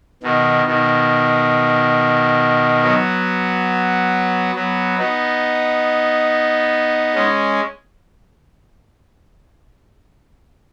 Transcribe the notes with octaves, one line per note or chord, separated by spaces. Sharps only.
B2 D#3
B2 D#3
F#3 B3
F#3 B3
B3 D#4
G#3 C#4